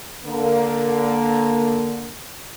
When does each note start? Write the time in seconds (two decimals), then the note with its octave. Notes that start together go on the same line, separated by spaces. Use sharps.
0.25 D3 A#3